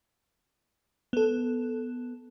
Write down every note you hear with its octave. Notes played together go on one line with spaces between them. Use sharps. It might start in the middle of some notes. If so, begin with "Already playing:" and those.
B3 A4